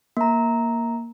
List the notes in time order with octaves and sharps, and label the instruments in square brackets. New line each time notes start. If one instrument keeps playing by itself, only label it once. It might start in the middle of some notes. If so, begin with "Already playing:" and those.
[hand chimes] A#3 A#5